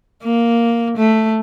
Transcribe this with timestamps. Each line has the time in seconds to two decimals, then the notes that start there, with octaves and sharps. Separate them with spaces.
0.23 A#3
0.97 A3